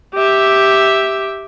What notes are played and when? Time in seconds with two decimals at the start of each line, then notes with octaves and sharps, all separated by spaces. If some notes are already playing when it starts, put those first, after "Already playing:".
0.14 G4 E5